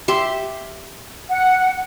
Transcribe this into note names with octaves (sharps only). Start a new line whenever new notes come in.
G4 E5 C6
F#5